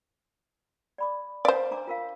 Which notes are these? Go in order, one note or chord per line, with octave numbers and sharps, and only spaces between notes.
D5 B5 D6
C5 D5 F5
D4 A#5 D6
F4 A#4 F5